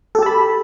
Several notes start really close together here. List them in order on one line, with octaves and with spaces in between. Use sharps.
A4 G4 A5 B5